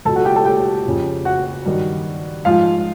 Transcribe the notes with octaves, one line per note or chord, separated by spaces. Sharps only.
C#2 B2 F#3 A4 A5
F#4 F#5
G4 G5
A4 A5
G4 G5
F2 C#3 F3
F#4 F#5
G2 D#3 F#3
G#2 F3 F4 F5